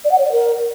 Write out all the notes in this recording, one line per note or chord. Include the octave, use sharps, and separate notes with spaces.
D5
F#5
C#5
D5
A#4